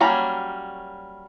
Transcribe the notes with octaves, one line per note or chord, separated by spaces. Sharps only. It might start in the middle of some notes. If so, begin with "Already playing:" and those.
F#3 G3 A#3 C#4